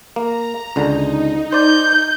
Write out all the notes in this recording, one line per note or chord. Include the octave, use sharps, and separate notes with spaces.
A#3 A#5
C#2 D3 D#4
C5 D5 G6